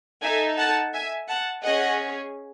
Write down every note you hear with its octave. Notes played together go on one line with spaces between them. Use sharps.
D#4 A4 E5 G#5
F#5 A5
E5 G#5
F#5 A5
C#4 G#4 D#5 F#5